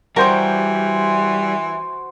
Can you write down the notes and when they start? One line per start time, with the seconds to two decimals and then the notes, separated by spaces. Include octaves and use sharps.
0.16 E3 G3 F#4 G4 A#4 C5